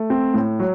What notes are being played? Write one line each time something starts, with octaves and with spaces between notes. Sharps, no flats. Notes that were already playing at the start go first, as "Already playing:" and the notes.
Already playing: A3
C4
A2
F#3